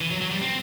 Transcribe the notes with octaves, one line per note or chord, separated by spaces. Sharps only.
E3
F#3
F#3
G3
C4